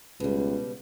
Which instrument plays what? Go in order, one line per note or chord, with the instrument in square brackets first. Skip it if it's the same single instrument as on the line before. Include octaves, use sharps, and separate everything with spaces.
[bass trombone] C#2 [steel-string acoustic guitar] B2 G3